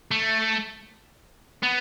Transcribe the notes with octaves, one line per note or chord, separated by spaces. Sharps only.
A3
B3